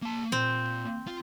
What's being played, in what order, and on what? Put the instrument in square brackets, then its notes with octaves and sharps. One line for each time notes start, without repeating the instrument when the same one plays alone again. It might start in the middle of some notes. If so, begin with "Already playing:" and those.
[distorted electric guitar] A#3 A5
[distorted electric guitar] A#2 [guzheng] C4
[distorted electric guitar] F4